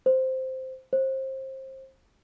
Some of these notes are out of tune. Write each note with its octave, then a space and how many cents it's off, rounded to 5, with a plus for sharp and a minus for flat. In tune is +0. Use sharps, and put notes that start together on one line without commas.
C5 -5
C5 +25